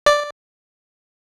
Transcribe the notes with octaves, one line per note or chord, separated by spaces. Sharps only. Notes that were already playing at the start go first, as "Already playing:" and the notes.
D5